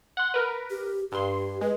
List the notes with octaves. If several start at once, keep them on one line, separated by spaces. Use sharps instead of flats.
F#5 C6
A#4 B4
G4
G2 G4 C6
G#3 B4